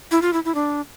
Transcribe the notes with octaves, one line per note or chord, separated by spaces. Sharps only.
E4
F4
E4
E4
D4